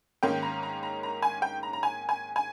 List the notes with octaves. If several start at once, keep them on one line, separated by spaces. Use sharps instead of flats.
G#2 D#3 A#3 C#4 G5
A#5
A#5
A#5
A#5
G#5
G5
A#5
A#5
G#5
G#5
G#5